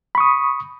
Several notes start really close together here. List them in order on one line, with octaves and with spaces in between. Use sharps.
B5 C#6 D#6